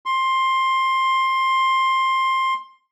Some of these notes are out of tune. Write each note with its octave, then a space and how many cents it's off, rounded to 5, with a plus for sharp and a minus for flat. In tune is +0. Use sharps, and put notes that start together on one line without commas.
C6 +15